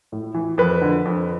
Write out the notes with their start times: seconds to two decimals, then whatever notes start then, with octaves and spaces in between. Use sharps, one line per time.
0.12 A2
0.34 E3
0.58 F2 B4
0.81 D3
1.05 F2